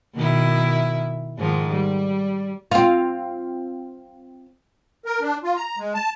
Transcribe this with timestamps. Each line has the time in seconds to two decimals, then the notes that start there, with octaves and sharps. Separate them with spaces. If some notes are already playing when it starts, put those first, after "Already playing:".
0.15 B2 D#3 E4
1.38 G#2 D#3 F3
1.72 G3
2.72 C4 F4
5.06 A#4
5.21 D4
5.44 F4
5.56 A#5
5.78 G#3
5.94 A5